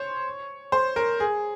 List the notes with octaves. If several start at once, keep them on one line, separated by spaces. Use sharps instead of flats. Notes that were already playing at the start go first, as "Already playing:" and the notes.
Already playing: C5 C#5
C5
A#4
G#4